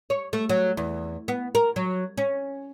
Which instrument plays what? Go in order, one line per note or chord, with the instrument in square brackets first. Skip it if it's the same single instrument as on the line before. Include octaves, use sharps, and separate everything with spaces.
[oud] C#5
A3
F#3
E2
B3
A#4
F#3
C#4